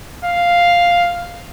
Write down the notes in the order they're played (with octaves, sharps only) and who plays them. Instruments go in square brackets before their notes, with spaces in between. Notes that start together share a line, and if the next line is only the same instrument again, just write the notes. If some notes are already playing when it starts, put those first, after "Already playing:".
[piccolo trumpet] F5